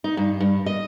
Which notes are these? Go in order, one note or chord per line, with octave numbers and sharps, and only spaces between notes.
D#4
G2
G2
D#5